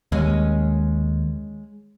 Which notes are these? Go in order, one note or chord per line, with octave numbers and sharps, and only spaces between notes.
D#2 G#3 C#4 D#5